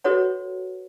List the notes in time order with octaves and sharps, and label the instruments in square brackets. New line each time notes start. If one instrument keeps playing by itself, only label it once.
[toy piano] F#4 A4 B4 C#5 F#5